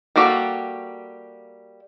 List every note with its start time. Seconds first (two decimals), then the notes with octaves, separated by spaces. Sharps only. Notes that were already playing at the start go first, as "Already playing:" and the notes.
0.16 G3 A#3 F#4 G4 A4